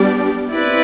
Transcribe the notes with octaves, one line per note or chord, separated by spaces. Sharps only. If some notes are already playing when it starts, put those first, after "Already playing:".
Already playing: G3 B3 D4 G4 D5
C4 E4 B4 D5